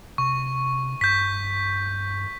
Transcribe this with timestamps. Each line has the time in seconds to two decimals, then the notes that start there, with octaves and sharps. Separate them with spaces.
0.18 C3 C#6
1.01 G2 G6 B6